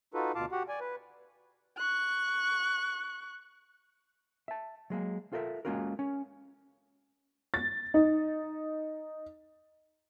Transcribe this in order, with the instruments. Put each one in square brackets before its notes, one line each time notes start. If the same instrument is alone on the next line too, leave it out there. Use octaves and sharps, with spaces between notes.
[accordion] D#4 F4 F#4 A4 B4
D2 B2 F4 F5 A5 D6
F#4 G4 F#5
D5 G#5
B4
[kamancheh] C#6 F#6
[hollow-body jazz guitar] E5 A5
F#3 G#3 A#3
F4 A4 A#4 D#5 E5
G#3 A#3 C#4 F4 F#4 A#4
C#4
[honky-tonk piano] A6
D#4